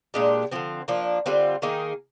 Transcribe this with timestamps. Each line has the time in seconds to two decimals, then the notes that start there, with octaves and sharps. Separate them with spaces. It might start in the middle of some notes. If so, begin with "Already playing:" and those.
0.14 A#2 G#3 D4 G4
0.52 D3 F3 C4
0.88 F3 A#3 D4
1.26 D3 G3 C4 F4
1.62 D#3 A#3 D#4 G#4